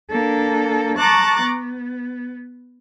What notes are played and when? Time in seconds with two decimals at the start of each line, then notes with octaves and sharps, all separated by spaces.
0.10 A#3 D4 A4
0.96 A5 A#5 C#6 D6 F#6 A6
1.42 B3